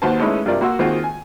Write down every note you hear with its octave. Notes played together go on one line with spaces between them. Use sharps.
D#2 F#4 B4 C5 A5
G#3 A3 C#4 D#4 E4 B4
G2 C3 F4 A#4 D5
A#3 F#4 C6 E6
D#3 A#3 C4 F4 F#4 G#4
G#5